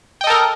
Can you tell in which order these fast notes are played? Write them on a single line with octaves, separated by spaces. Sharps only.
G5 D#5 A4 A#4